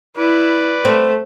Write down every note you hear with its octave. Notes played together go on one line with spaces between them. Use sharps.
E4 B4 D5
A3 C4